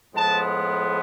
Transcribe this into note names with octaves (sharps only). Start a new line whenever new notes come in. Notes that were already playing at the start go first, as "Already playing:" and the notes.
A2 F3 G#3 B3 A5